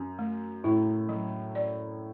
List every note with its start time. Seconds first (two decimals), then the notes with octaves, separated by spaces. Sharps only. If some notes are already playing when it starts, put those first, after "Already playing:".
Already playing: F#2
0.19 A3
0.64 A2 E4
1.09 F#3
1.55 D5